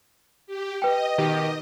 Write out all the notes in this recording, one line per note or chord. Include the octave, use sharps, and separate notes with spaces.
G4
B4 D#5 G5
B2 D#3 G4